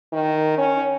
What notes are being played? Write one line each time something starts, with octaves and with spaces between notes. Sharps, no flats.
D#3
C#4